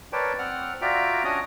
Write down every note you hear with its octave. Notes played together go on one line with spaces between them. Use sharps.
A#4 B4 C#5 D5 G5 A5
C4 F#5 F6
F4 F#4 D5 E5 G5 A#5
C#4 D4 F#4 C#5 D#5 D#6